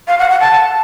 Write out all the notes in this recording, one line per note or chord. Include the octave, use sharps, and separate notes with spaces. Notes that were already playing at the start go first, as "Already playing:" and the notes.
F5
F#5
F#5
A5